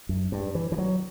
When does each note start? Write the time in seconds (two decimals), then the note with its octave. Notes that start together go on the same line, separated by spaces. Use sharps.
0.09 F#2
0.32 G2
0.55 E3
0.72 E3
0.78 F#3